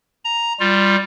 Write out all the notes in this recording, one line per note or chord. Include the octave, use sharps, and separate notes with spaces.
A#5
G3 F4